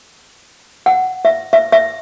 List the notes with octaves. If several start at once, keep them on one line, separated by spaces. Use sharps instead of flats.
F#5
E5
E5
E5